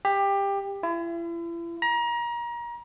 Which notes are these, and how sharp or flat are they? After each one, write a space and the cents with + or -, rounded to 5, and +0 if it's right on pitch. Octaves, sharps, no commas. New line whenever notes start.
G4 +20
E4 +40
A#5 +30